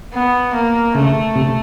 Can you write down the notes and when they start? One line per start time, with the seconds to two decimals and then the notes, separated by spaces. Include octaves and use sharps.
0.14 B3
0.54 A#3
0.95 C#3 A3
1.36 C3